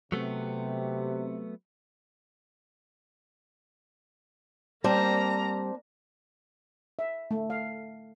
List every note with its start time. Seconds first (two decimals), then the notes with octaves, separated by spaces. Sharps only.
0.12 C3 F#3 A3 B3
4.84 G3 A#3 C4 D4 C5 A#5
6.99 E5
7.31 A3
7.50 F5